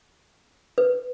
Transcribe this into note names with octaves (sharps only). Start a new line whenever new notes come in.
B4